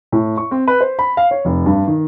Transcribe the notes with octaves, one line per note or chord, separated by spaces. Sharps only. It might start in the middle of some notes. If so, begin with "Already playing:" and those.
A2
C#6
C4
B4
C5
B5
F5
C#5
F1
G2
D#3